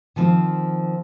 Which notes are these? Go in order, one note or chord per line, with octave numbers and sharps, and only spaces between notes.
D#3 F3 C4